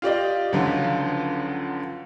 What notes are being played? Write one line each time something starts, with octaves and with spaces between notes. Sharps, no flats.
F4 G4 D5 D#5
C#2 D3 F3 F#3